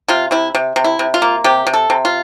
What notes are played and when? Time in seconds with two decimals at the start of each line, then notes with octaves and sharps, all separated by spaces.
0.08 C3 F4
0.31 C3 E4
0.55 C3
0.76 C3
0.84 E4
0.99 C3
1.14 F4
1.22 A#3
1.44 C3 G4
1.67 C3
1.74 A4
1.90 C3
2.05 F4